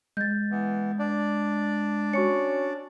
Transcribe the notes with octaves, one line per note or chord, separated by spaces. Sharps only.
G#3 G6 A6
E3 B3
D4 D5
C#4 F#4 C#6 C#7